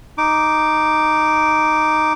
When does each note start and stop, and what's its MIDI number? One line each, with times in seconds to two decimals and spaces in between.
0.18 2.13 63
0.18 2.13 86